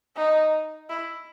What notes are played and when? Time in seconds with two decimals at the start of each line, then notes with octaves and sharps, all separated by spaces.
0.16 D#4
0.89 E4